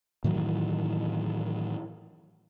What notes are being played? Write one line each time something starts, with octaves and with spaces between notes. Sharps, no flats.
A2 D#3 E3 F#3